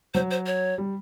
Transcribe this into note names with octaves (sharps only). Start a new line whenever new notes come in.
F#3 C5
C5
C#5
G3